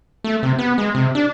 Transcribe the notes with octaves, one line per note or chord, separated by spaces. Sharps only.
A3
C3
B3
G#3
C3
D4